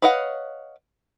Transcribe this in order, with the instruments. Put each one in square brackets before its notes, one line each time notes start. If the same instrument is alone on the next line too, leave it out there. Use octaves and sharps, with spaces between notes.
[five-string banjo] B4 C#5 D#5 F5 F#5